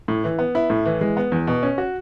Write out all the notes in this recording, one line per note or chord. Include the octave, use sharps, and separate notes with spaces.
A2
E3
B3
E4
A2
E3
G#3
B3
E2
B2
C#4
F#4